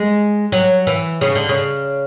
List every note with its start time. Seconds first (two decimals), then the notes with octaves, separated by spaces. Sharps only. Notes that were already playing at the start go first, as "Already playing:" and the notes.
Already playing: G#3
0.52 F#3
0.87 E3
1.21 C#3
1.35 D3
1.49 C#3